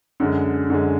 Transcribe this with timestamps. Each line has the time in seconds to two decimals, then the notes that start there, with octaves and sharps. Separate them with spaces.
0.20 F#2 D3 G#3
0.70 F#2 D3 G#3